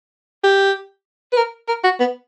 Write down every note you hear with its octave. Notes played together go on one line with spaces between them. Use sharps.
G4
B4
A#4
A#4
F#4
B3